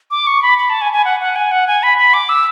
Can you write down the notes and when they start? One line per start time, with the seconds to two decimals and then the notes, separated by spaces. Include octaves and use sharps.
0.11 D6
0.27 C#6
0.42 B5
0.58 B5
0.70 A5
0.81 G#5
0.93 G#5
1.05 F#5
1.20 F#5
1.36 G#5
1.51 F#5
1.67 G#5
1.83 B5
1.98 B5
2.14 D6
2.29 E6